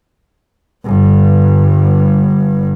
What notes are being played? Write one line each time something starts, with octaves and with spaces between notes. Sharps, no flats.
G1 G2